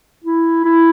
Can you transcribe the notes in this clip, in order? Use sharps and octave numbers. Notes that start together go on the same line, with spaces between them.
E4
E4